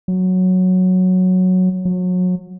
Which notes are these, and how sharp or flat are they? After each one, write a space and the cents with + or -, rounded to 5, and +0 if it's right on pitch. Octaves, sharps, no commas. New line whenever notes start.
F#3 -5
F#3 -30